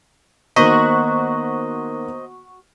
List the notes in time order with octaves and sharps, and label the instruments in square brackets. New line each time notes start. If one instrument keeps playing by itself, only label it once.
[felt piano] D#3 A#3 B6 [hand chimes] B3 A#5 [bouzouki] F#4 [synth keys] C5 D#5